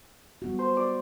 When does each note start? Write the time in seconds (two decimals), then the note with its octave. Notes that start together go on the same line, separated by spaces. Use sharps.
0.42 G3 B3 F#4
0.59 C5
0.77 D5